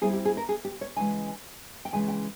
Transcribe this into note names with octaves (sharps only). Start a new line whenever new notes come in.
G3 C4 E4 G#4
G4
G#4
A#4
G#4
G4
C#5
C#3 E3 G#3 G#5
G5
C#3 E3 G#3 C#4 G#5
G5